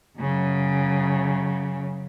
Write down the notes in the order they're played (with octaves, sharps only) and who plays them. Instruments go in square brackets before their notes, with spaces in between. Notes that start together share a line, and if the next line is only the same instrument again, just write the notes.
[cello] F#2 C#3